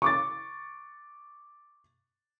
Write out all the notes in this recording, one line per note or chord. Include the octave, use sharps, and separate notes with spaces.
C#6 D6 A6